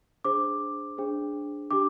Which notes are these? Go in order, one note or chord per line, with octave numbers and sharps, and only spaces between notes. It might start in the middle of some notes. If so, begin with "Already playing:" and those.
D4 G#4 C5 D6
D4 G#4 C5
D4 G4 D6